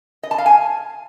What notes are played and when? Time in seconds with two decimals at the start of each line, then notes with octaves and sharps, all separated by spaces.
0.23 D#5
0.31 A5
0.38 F5
0.46 G#5